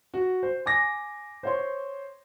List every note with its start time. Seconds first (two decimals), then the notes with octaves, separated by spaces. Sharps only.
0.14 F#4
0.43 C5
0.66 G#5 D6 A#6
1.43 C5 C#5 C6